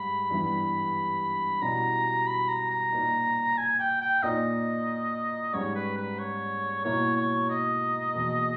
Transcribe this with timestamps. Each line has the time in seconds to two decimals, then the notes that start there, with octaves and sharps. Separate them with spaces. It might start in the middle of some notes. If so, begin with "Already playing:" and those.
Already playing: G#2 G3 B5
0.30 G2 E3 G3 B3 E4
1.62 B2 G3 C#4 E4 A#5
2.27 B5
2.49 A#5
2.70 A#5
2.92 A#2 A#3 D#4
3.58 G#5
3.79 G5
4.01 G5
4.23 A#2 A#3 D#4 D#5
5.53 G#2 G3 C#4 C#5
5.75 B4
5.97 B4
6.19 C#5
6.85 B2 A#3 E4 C#5
7.17 C#5
7.50 D#5
8.15 E2 B2 A#3